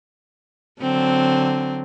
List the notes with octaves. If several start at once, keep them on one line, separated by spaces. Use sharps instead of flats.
D3 F#3 C4